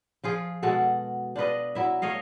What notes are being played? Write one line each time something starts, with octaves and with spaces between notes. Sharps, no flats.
F3 F4 G#4
B2 G#3 F#4 A4
D4 F4 B4 D#5
F#3 E4 E5
A3 C#5 D#5 F5